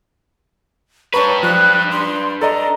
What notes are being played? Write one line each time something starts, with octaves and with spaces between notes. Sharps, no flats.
D4 B4 C#5 A5 A#5 C#6
F3 F#6
C6
A4 D5 D#5 A#5